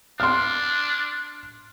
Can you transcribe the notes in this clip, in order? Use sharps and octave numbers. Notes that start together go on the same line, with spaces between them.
D4 C6 F6